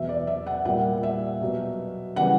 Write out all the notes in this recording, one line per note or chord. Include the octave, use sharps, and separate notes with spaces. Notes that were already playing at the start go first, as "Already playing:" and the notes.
Already playing: E2 B2 F#3 E5
D5
E5
F#5
A#2 G3 F#5
E5
B2 F#3
C#3 E3 G3 F#5